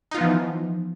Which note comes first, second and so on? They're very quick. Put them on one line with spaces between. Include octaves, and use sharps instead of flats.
D#4 F4 B3 F3 E3